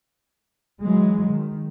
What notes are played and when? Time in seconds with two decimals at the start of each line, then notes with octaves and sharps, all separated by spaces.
0.82 E3 F#3 G#3
1.29 D#3